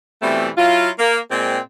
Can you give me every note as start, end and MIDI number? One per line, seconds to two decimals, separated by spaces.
0.22 0.49 47
0.22 0.49 52
0.22 0.49 55
0.22 0.49 57
0.22 0.49 60
0.58 0.89 54
0.58 0.89 64
0.58 0.89 65
0.99 1.18 58
1.30 1.59 46
1.30 1.59 56
1.30 1.59 60